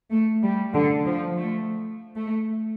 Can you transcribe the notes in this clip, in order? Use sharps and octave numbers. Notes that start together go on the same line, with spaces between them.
A3
G3
D3
F3
A3
A3